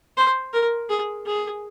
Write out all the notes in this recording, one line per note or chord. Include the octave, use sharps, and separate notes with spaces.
C5
A#4
G#4
G#4